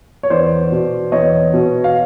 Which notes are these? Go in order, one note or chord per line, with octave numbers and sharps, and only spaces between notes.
C#5
E2 C5 D5
B2
E2 C#5 D#5
B2
F5